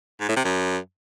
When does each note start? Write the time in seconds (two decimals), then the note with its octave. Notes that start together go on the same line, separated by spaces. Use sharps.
0.21 G#2
0.29 A2
0.36 C3
0.44 F#2